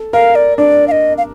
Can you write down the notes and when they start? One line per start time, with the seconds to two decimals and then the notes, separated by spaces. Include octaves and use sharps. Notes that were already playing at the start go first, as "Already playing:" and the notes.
Already playing: A4
0.13 A#4 F5
0.35 D5
0.58 D4 D5
0.88 F5
0.92 D#5
1.18 F5